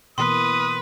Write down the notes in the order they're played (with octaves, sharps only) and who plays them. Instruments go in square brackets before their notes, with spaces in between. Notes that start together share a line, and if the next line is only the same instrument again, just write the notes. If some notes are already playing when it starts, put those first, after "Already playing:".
[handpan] B2 E3 A#3 [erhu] B4 [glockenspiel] C6 [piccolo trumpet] D#6